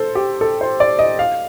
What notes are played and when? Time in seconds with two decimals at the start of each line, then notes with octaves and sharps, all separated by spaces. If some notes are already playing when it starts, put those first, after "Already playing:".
Already playing: A4 C5
0.15 G4
0.41 A4
0.61 C5
0.80 D5
0.99 D#5
1.19 F5